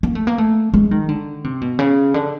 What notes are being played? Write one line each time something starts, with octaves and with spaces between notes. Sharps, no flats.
A#3
A3
A#3
A3
G#3
D#3
D3
C3
B2
C#3
D3